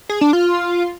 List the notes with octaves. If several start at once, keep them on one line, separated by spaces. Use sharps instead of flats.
G#4
D4
F4